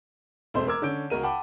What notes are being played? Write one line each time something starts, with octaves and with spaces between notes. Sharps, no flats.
E1 A3 C4 C5
A#4 D6 E6 G#6
D3 C#4 G6 D7
C#2 F#4 A#4 D#7
F#5 G5 A5 B5 D6